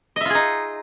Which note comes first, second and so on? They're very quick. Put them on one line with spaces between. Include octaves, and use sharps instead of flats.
D#5 E5 F4 G#4 D#4